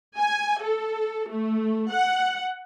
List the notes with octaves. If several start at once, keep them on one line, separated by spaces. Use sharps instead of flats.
G#5
A4
A3
F#5